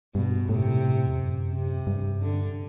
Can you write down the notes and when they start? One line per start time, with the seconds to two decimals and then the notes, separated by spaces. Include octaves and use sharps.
0.15 G2 B2
0.49 A2 C3
1.07 E2
1.18 F#2
1.52 C3
1.87 G2
2.21 D3